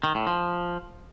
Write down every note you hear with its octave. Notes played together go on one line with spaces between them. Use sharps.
D#3
A2
F3